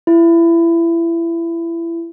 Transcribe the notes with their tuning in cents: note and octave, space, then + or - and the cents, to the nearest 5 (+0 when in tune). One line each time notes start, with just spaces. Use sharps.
E4 +25